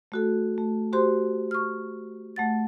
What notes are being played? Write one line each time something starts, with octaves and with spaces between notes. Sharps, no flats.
A3 F#4 A4
A3
F#4 G4 C5 C6
C#6 F6
A3 F#5 A6